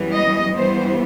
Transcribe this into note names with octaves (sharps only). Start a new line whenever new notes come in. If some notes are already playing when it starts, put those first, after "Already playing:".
Already playing: F#2 E3 G3 B3
D#5
G2 E3 G3 B3 C5